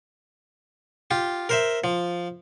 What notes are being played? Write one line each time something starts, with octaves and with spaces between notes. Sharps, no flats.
F4 G4
A#4 C5 E5
F3